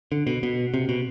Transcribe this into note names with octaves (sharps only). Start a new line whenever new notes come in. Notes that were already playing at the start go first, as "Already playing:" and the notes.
D3
B2
B2
C3
B2